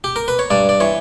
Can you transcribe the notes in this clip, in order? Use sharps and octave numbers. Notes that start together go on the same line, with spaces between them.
G4
A#4
B4
C#5
G2 D5
D5
E3 C#5